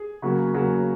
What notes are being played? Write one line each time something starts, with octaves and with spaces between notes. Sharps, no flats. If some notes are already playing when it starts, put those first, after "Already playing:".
Already playing: G#4
C#3 F#3 A#3
C#3 F#3 A#3